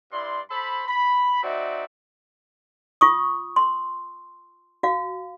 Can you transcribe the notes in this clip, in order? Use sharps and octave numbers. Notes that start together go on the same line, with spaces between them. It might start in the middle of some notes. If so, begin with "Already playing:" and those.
G2 E4 D5 C6
A4 C5 B5
B5
C4 D#4 F#4 D5 E5
F4 C#6 D#6
C6
F#4 F5